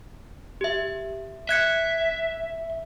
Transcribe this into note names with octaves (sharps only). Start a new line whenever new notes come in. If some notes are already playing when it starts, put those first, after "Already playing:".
G4 E5
E5 F#6 G#6 C#7